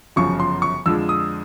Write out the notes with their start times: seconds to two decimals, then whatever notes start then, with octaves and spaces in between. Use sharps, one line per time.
0.16 G1 F#2 C#3 F3 C#6
0.40 C6
0.62 C#6
0.86 F2 D3 F3 G#3 E6
1.09 D#6